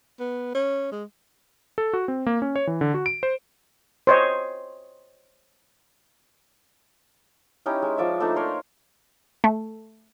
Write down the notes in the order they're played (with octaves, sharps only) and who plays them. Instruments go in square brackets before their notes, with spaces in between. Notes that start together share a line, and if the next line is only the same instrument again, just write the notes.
[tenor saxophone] B3
C#4
G#3
[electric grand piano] A4
F#4
C4
A#3
C#4
C#5
E3
D3
F#4
D7
C5
[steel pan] C5 C#5 D#5
[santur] C#4 D#4 E4 G4
G#3
F3 D5 E5
A3 A#3 D4 D#4
A#4 C5 C#5 C6
[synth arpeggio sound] A3